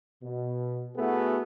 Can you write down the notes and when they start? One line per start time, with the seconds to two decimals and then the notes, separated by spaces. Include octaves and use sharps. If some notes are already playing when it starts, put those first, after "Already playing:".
0.23 B2
0.96 A3 B3 E4 F#4 G#4 A4